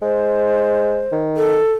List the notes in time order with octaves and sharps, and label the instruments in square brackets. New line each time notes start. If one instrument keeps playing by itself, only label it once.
[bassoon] G#3 [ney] C5
[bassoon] D#3
[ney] A4